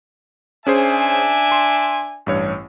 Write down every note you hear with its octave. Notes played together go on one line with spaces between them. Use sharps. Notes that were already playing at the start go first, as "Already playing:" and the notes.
C#4 D4 G#4 C5 E5 G#5
C6
A1 G2 C#5